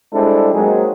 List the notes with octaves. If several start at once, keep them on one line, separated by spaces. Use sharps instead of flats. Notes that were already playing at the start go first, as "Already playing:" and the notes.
G3 G#3 C4 D4 E4 A4
F#3 G#3 A#3 C4 D#4 G#4